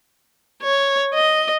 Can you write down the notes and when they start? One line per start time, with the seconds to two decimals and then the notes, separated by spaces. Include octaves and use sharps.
0.63 C#5
1.15 D#5